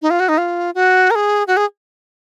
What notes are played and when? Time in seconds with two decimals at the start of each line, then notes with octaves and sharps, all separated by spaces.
0.02 D#4
0.10 F4
0.20 F#4
0.28 D#4
0.38 F4
0.75 F#4
1.10 A#4
1.15 G#4
1.47 F#4
1.57 G#4